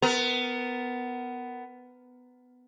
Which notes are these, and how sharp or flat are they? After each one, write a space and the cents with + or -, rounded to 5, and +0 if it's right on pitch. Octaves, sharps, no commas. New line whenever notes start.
B3 +15 A#4 +0